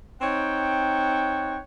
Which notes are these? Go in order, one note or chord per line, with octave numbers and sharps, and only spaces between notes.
C4 D#4 C#5 F#5 G5